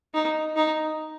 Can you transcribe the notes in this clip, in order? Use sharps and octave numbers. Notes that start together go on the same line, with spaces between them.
D#4
D#4